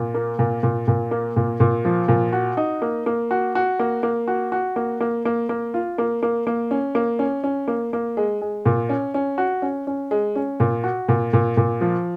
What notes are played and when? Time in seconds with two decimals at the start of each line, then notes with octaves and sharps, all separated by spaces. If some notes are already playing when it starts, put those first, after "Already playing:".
Already playing: A#2
0.14 A#3
0.39 A#2
0.63 A#2
0.88 A#2
1.11 A#3
1.36 A#2
1.60 A#2
1.85 F3
2.08 A#2
2.33 F#4
2.57 D#4
2.82 A#3
3.06 A#3
3.31 F#4
3.55 F#4
3.79 A#3
4.03 A#3
4.28 F#4
4.52 F#4
4.76 A#3
5.00 A#3
5.25 A#3
5.49 A#3
5.74 F4
5.98 A#3
6.23 A#3
6.47 A#3
6.71 C#4
6.95 A#3
7.19 C#4
7.44 C#4
7.68 A#3
7.93 A#3
8.17 G#3
8.41 G#3
8.66 A#2
8.89 C#4
9.14 C#4
9.38 F#4
9.62 C#4
9.87 C#4
10.11 G#3
10.36 C#4
10.60 A#2
10.84 F#4
11.08 A#2
11.33 A#2
11.57 A#2
11.81 F3